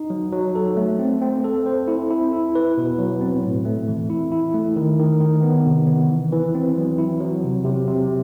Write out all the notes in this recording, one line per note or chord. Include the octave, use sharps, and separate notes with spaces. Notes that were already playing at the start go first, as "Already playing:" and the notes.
Already playing: D#4
F#3
F#3
A4
A3
C4
C4
A4
C5
E4
E4
E4
B4
B2
F#3
C4
A2
A3
E3
E4
E4
A3
D#3
D#3
D#3
B3
C3
B3
E3
E3
C4
F#3
E4
F#3
C3
C3
C3